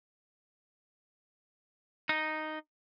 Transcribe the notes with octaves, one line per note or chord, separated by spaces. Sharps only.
D#4